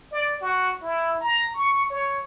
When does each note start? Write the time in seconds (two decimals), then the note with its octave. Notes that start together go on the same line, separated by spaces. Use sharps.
0.12 D5
0.42 F#4
0.82 E4
1.21 A#5
1.54 C#6
1.90 C#5